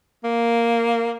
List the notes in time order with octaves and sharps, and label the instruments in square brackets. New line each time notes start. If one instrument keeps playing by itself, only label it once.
[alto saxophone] A#3